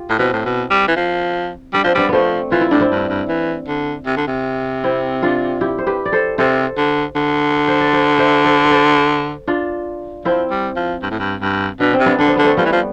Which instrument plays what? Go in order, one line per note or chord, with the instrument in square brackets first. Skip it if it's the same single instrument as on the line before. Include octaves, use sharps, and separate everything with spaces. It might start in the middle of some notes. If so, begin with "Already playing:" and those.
Already playing: [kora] F4 G4
[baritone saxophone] A2
[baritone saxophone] B2 [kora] C4 E4
[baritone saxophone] A2
B2
G3
E3
F3
[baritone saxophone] G3 [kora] D4
[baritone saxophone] F3 [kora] C4
[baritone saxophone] G3 [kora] B3 D4
[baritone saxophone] F3 [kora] A3 B3 C4
[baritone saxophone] E3 [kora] F4
[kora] E4
[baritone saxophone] A2 [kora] D4
[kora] C4 E4
[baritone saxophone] G2
G2
E3
D3
C3
D3
C3
[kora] C4 E4
D4 F4
E4 G4
C5
G4 B4
D5
A4 C5
[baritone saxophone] C3 [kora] A4 C5
[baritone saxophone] D3
D3
[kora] C5
D5
C5 E5
C5 E5
A4 C5
B4
A4 C5
D4 F4
[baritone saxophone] F3 [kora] C4 E4
[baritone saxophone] G3
F3
G2
A2
G2
G2
[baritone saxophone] B2 [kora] D4
[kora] C4
[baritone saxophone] C3
[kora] B3 D4
[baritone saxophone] D3 [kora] D4
[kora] C4
[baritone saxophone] D3 [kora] B3
[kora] A3 C4
[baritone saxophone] F3 [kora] G3 B3
[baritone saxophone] E3
F3